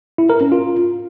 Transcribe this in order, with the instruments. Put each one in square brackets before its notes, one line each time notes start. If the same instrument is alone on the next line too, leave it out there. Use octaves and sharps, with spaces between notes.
[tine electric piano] E4
A#4
C#4
F4